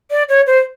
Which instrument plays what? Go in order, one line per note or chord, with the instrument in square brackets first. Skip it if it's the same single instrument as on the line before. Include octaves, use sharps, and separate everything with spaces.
[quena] D5
C#5
C5